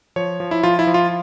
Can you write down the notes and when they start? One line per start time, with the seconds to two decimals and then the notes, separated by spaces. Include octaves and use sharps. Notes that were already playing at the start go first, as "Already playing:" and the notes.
0.16 F3 C#5
0.40 F3
0.51 E4
0.63 F3 F4
0.79 E4
0.87 F3
0.94 F4